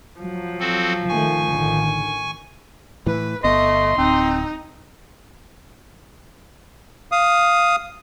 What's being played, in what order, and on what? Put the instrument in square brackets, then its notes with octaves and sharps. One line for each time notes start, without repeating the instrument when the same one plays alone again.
[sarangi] F3 [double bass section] F#3
[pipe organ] C4 F#4 A4
[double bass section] D#3 A3 [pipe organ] G#5 C#6
[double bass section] A1 D3 D#3
[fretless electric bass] A2 E3 [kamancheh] B4
[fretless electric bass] G1 B3 [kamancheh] A3 [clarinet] D#5 [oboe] C6
[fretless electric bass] D1 [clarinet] C4 [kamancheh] D#4
[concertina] F5 D#6